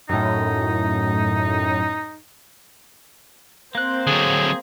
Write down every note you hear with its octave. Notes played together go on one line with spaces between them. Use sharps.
F#2 A2 D#4
A#3 C4 C5 F#6
D3 F#3 G#4